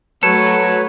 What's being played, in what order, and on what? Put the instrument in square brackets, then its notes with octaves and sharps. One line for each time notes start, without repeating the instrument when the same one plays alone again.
[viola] F#3 A3 [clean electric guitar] A4 [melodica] B4 C#5